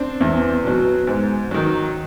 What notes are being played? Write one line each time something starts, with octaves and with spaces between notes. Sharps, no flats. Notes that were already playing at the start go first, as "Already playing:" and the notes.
Already playing: C4 D4
E2
B2 F#3
G#2
D#3 F#3